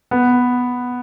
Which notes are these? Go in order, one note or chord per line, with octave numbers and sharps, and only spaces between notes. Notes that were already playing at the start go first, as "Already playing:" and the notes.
B3